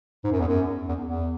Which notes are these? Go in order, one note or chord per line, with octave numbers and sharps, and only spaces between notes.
G#2
F#2
E2
F#2
E2
E2